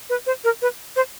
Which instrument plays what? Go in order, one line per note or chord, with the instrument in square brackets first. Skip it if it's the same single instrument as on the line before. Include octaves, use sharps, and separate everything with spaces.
[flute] B4
C5
A#4
B4
C5